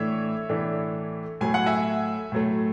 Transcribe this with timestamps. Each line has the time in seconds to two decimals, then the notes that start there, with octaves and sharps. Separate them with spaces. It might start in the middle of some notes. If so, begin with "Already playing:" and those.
Already playing: A2 E3 A3 D4 C#5 E5
0.49 A2 E3 A3 D4
1.41 A2 F#3 A3 G#5
1.54 F#5
1.66 E5 G#5
2.32 A2 F#3 A3